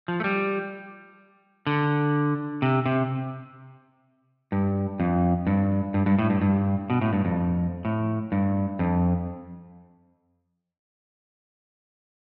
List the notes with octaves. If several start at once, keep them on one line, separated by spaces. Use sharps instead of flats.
F3
A3
G3
D3
C3
C3
G2
F2
G2
G2
G2
A2
G2
G2
B2
A2
G2
F2
A2
G2
F2